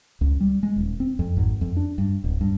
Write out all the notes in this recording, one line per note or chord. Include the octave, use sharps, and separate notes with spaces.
C#2
G3
G#3
D#1
C4
F2
G#1
F2
D4
G2
D1
G2